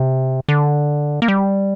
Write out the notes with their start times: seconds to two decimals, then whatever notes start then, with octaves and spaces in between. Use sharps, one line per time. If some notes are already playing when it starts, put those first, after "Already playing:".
Already playing: C3
0.49 D3
1.22 A#3
1.28 G3